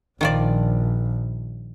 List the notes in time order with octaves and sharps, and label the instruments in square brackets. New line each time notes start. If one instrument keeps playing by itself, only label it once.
[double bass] A#1 [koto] D#3 F3 D5